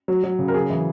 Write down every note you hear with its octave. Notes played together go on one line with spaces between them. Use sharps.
F#3
F#3
C#3
A#4
C#3 G#4
E3